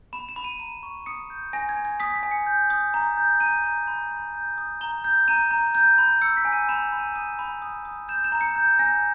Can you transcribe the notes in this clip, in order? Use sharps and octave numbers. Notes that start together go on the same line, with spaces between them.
B5 E7
E7
B5
D#7
A#5 D#7
C#6
D#6 C#7
G6
G#5 A#6
G#6
G#5
G#6
D#6 B6
B6
G#5
C#7
G6
D#6
A#5
G6
A#5 D#7
A#5
B5
B5
G6
D#6
A#5 G7
G6
A#5 D#7
A#5
G6
B5
E6 C#7
B6
G#5
D#7
B5 E7
E7
B5
D#7
D#6 D#7
B5
D#6
D#6
G6 E7
E7
A#5
C#7
G6
G#5 A#6